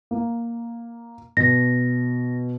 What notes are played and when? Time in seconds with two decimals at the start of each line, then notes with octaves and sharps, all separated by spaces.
0.11 A#3
1.37 B2 A#6